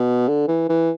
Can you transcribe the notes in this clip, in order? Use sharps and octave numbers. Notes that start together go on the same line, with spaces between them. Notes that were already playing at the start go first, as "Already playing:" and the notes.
Already playing: B2
D3
E3
E3